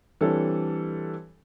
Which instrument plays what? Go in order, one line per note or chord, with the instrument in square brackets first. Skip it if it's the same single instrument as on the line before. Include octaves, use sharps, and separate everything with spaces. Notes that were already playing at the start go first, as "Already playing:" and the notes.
[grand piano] E3 G3 C4 D4 A4 C#5